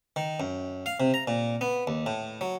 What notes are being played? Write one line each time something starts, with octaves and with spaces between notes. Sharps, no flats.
D#3
F#2
F5
C3
A#5
A#2
B3
D#2
A2
F#3